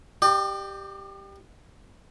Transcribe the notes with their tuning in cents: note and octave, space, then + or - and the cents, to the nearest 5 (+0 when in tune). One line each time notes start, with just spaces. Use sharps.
G4 +0 D5 +45